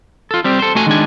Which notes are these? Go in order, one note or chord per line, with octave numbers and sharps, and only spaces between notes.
F4 A4
G3 C4 G4
A4 C5
A3 F#4 G#5
D#3 G#3 D4 G#5